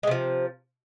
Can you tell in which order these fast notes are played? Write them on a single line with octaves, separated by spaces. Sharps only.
G#3 C3 F3